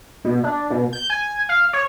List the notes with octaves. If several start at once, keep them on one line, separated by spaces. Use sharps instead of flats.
B2
D4
B2
G6
G#5
F5
C#5